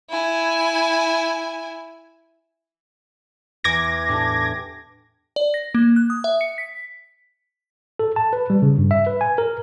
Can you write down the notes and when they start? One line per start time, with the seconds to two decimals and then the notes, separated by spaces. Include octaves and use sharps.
0.10 E4 G#5
3.64 E2 D6 G#6 A#6
4.08 A2 D4 G4
5.36 D5
5.54 A#6
5.75 A#3
5.96 F#6
6.10 D#6
6.24 E5
6.41 C#7
6.58 B6
7.99 A4
8.16 A5
8.33 B4
8.50 G3
8.62 C#3
8.78 G2
8.91 E5
9.06 B4
9.21 G#5
9.38 A#4